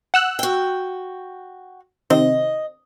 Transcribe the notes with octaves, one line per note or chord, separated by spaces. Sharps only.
F#5 E6 F#6
F#4 G5
C3 D#3 C4 D#5